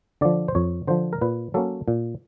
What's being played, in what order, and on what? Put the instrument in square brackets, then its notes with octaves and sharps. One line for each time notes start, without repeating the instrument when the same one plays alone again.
[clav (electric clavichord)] D3 F3 D5
C5
F2 C#5
D3 F3 C5
A#4
A#2 B4
F#3 A#3 C#4 A4
A#2